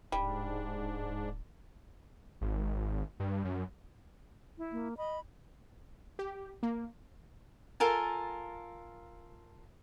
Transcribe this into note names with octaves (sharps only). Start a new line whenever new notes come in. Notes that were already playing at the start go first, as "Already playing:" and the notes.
D1 G#2 G3 D4
G#1
G2
F#2
E4
A#3
D#5 B5
G4
A#3
F4 A4 A#4 G#5